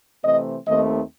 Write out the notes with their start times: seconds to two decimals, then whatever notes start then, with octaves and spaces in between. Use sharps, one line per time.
0.22 C3 E3 A3 C4 D#5
0.66 D#2 D#3 A3 C4 D#5